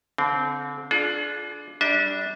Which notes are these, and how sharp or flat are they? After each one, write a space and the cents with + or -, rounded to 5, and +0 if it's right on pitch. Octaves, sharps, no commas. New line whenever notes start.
D3 -40 C4 -15
D4 +0 F4 +0 G#4 +40
G3 +0 D4 +0 E5 -40